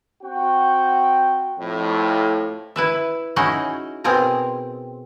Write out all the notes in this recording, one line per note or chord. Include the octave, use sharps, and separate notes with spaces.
C4 F#4 F#5 G5
F2 A2
E4 B4 E5
C#4 D#4 E4 F#4 G#4 D#5
B2 C4 G#4 A#4 G#5 A#5